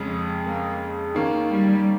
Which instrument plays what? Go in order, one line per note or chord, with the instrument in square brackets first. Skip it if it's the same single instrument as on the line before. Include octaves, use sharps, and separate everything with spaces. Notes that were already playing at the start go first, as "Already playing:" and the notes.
Already playing: [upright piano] F2 C#3 G#3 C#4 G#4
[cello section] A#3
[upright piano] D#3 A#3 C#4
[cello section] G3